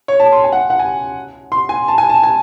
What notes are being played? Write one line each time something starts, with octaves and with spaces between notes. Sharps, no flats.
C#5
A5
C6
G#5
F#5
F#5
G#5
C6
G#5
A5
G#5
A5
G#5